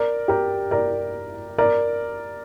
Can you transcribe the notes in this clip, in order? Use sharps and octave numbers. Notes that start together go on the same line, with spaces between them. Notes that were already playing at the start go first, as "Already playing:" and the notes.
Already playing: A#4 D5
G4 A#4
A#4 D5
A#4 D5